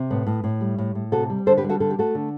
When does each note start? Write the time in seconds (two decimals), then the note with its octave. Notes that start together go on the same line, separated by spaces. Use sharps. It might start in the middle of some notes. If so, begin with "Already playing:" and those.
Already playing: C3
0.11 A2 B3
0.27 A2
0.44 A2
0.61 G3
0.78 A2
0.95 A2
1.12 C3 F#4 A4
1.30 G3
1.46 D3 A4 C5
1.57 G4 B4
1.64 G3
1.69 F#4 A4
1.80 D3 A4
1.90 G4
1.99 A3 F#4 A4
2.15 D3